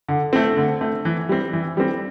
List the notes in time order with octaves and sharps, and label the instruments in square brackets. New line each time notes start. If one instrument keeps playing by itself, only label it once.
[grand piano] D3
A3 C4
D3
A3 C4
E3
G3 C4
E3
G3 C4